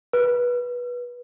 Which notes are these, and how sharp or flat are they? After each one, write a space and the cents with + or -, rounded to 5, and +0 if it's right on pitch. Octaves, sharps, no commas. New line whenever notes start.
B4 -20